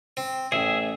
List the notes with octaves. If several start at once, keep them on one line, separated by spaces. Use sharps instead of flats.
C4
A1 G#4 E5